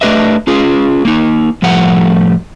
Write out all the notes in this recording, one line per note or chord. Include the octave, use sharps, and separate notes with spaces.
A3 D4 G4 B4 D#5 E5
C#4 F4 G#4
A#3 D#4
A2 F3 G3 A3 F#5